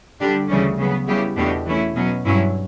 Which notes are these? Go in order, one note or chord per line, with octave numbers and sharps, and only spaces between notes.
D3 G3 D4 G4
D2 C#3 E3 G3 C#4
C#3 F#3 B3
C#3 G3 B3 E4 G4
E2 B2 A3 D4 G4
E3 A3 C#4 E4
B2 F#3 C#4
G2 F#3 C#4 E4